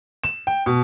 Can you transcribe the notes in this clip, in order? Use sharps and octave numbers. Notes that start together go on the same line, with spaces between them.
E7
G5
B2